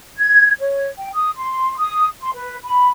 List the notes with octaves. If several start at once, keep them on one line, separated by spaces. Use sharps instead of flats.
G#6
C#5
G5
D#6
C6
D#6
C6
B4
B5